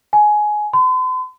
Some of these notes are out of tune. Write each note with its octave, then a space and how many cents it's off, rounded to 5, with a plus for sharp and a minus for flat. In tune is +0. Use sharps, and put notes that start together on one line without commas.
G#5 +15
C6 -45